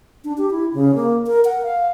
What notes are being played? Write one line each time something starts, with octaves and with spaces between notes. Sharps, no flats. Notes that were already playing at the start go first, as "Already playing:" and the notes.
D4
G4
E4
C#3
A#3
A#4
F#5
F5